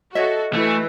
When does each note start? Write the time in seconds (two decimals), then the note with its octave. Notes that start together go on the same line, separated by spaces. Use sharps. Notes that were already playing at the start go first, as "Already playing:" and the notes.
0.15 F#4 A4 C#5 D#5 E5
0.54 E3 A3